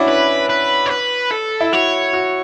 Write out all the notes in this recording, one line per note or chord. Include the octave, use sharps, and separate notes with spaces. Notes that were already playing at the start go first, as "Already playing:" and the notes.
Already playing: C#4 D4 E4 F#4
B4
B4
C#5
B4
A4
E4
F#4 C#5
F#4